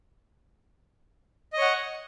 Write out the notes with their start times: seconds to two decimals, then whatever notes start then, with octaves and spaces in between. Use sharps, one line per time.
1.53 D#5
1.57 C#5
1.62 F#5